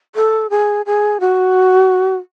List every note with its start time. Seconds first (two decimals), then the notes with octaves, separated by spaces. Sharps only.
0.15 A4
0.50 G#4
0.86 G#4
1.20 F#4